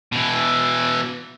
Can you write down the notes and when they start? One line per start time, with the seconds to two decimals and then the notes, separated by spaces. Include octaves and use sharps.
0.12 B2 E3